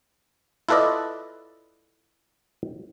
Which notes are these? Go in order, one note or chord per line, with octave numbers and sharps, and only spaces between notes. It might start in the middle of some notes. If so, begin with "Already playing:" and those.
E4 F4 A4 B4 D5 D#5